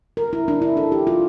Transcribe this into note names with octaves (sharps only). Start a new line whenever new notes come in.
A#4
E4
D4
E4
A4
G4
F4